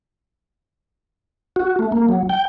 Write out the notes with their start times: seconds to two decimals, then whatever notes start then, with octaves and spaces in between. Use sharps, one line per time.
1.56 F#4
1.79 A3
1.92 A#3
2.09 F#3
2.29 G5